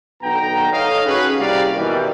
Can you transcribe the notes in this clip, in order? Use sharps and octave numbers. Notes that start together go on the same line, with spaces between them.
B1 D3 B3 G5 A#5
D#4 A4 C#5 D#5 F5
C#4 F#4 G#4 B4
C2 C3 G3 A#3 D5 F5
B2 D#3 E3 G3